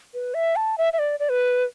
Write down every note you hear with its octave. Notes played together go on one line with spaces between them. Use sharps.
B4
E5
A5
E5
E5
D5
D5
B4